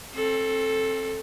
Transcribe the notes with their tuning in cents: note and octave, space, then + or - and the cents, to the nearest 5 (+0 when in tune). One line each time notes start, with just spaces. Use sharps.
C4 +30 A4 +0